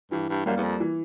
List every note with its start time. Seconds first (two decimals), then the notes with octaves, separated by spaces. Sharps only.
0.12 G2 E3
0.29 G2
0.46 F#2 G3 A#3
0.57 E2
0.63 F2
0.80 E3